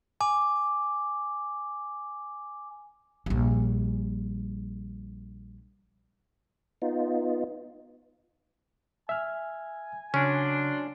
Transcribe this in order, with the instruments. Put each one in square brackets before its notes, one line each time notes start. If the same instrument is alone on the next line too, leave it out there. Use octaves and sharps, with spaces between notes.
[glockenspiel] G#5 D6
[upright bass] A#1 G3
[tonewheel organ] B3 D#4 F4
[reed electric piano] E5 F6 [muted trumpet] G#5
[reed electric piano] C#3 [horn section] F#3 D4 C6 [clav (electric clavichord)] C#4